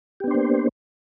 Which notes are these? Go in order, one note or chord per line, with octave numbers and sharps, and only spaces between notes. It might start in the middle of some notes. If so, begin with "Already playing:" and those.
A#3 B3 D4 G4 C5